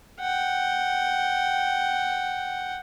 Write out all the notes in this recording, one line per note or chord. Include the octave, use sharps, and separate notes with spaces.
F#5 G5